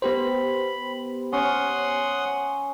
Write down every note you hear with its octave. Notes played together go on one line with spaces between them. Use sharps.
B3 G4 C5 B5
C#4 F#5 C6 D#6